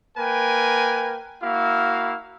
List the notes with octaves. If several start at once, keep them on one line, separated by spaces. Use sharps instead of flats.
A#3 A#4 B4 G5 G#5
A#3 E4 F#4 F5